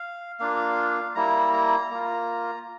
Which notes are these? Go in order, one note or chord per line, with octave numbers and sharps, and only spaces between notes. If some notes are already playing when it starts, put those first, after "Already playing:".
Already playing: F5
A#3 D4 F4 F5
G3 A#3 E4 A#5
A#5
A#3 F4 A#5